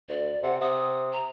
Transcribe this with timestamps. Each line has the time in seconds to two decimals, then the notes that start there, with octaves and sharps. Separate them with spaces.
0.09 D2 D5
0.43 C3 F#5
0.61 C3 D#6
1.13 A#5